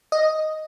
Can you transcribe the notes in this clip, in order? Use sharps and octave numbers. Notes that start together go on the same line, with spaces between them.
D#5